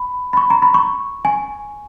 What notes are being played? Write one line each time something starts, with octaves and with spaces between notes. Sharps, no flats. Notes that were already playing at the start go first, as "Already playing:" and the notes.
Already playing: B5
B5
C#6
A#5
B5
C#6
G#5